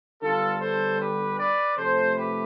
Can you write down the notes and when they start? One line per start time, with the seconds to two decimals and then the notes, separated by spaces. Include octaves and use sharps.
0.22 D3 G3 B3 F4 A4
0.61 A4 C5
1.00 G4 B4
1.39 B4 D5
1.77 C3 F3 A3 A4 C5
2.16 G4 B4